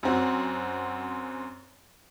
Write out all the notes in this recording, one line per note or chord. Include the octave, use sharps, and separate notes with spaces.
F#2 C4 F#4